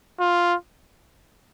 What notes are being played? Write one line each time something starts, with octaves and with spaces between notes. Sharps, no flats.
F4